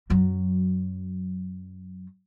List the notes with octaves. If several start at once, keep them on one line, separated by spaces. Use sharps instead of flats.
F#2 F#3